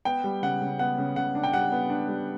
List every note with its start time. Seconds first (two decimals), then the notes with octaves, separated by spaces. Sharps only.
0.05 B3 G5
0.24 G3
0.43 C#3 F#5
0.61 C#3
0.79 B3 F#5
0.98 C#3
1.16 C#3 F#5
1.35 D4
1.44 G5
1.53 G3 F#5
1.72 B3
1.90 D4
2.08 G3